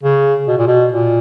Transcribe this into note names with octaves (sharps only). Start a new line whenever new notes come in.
C#3
B2
A#2
B2
A#2